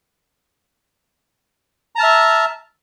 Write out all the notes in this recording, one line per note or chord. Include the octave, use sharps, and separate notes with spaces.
E5 A5 A#5 F6